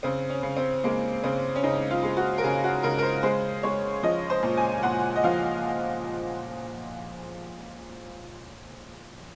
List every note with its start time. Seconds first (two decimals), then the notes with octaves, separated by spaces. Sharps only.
0.03 C#3 C4
0.30 C#4
0.43 C#3
0.57 C4
0.84 G#3 A#3
1.24 C#3 C4
1.56 C#4
1.63 C#3 D#4
1.91 F4
2.03 G#3
2.17 F#4
2.38 A#4
2.43 C#3 G#4
2.64 F#4
2.83 C#3 A#4
2.98 A#4
3.03 C5
3.23 G#3 C5
3.63 G#3 C#5
4.03 F3 D#5
4.30 C5
4.43 A#2
4.57 G#5
4.83 A#2 F#5
5.16 D#5
5.24 F3 F5